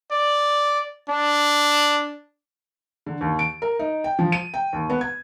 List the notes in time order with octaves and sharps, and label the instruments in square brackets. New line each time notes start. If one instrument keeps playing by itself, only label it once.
[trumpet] D5
D4
[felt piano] D3
D#2
D7
A#4
D#4
G5
F3
D#7
G5
D#2
B3
G#6